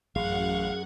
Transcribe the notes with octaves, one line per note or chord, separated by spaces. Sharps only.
A1 F#2 F#3 G#4 F5 F#5